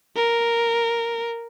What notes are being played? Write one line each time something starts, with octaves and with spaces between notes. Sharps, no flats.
A#4